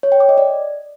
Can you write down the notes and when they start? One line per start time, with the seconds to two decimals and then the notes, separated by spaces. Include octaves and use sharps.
0.03 C#5
0.12 G5
0.20 D6
0.29 D#5
0.37 D5